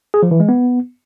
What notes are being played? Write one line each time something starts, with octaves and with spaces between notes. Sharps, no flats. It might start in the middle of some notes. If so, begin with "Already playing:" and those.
G#4
F3
E3
G#3
B3